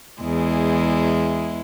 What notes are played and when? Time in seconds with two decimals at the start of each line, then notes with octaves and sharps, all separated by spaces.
0.21 E2 G#3 E4